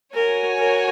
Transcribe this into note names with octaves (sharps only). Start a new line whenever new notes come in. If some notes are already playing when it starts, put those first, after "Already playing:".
F#4 A#4 C#5 G#5
A#4